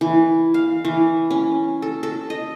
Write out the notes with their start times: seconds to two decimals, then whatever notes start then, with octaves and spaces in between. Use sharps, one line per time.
0.01 E3
0.54 F5
0.85 E3
1.30 C#4
1.82 A4
2.03 A4
2.30 D#5